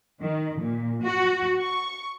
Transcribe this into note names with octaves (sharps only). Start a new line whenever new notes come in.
D#3
A#2
F#4
C#6